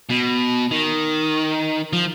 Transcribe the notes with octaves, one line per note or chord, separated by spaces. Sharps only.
B2
D#3
F3